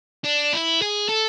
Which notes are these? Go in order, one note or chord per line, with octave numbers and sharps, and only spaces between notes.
D4
E4
G#4
A4